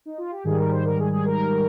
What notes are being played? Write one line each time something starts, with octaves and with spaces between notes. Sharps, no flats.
D#4
F4
G4
G#2 D#3 G3 G#4
A#4
C5
A#4
G#4
G#4
A#4